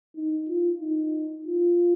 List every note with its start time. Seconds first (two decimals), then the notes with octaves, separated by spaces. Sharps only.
0.16 D#4
0.48 F4
0.81 D#4
1.47 F4